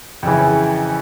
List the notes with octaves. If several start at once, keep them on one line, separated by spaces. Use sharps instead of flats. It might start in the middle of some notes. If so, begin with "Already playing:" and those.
F2 C#3 E3